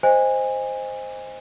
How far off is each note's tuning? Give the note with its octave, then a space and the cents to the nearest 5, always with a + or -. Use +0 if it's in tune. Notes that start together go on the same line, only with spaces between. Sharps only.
C5 +0 D#5 +0 G#5 -25